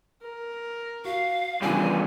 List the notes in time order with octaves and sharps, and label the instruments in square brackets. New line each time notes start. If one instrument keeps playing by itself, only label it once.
[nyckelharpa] A#4
[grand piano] F#4 [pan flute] F5
[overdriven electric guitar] E2 G2 [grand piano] C#3 F3 [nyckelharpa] D4 [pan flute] G#5